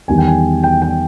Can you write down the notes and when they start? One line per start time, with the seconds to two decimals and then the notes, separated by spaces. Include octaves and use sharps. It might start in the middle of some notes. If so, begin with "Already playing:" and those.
0.08 E2 D#3 G3 G#5
0.18 G5
0.28 G#5
0.64 G5
0.82 G5